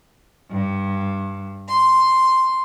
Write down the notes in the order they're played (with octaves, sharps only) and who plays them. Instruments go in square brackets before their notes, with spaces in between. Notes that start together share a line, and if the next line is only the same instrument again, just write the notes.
[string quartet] G2
C6